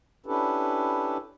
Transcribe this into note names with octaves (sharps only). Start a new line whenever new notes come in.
C#4 D4 E4 G4 A4 B4